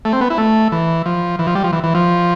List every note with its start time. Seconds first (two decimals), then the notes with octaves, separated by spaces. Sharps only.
0.05 A3
0.13 C4
0.21 B3
0.30 E4
0.38 A3
0.72 E3
1.06 F3
1.39 E3
1.47 F3
1.55 G3
1.64 F3
1.73 E3
1.84 E3
1.95 F3